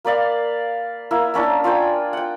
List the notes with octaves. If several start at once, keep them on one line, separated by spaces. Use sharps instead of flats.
A#3 B4 D5 F5
A#3 E4
A#3 C#4 D4 E4
F4 D5 G5 G#5
F#5 G5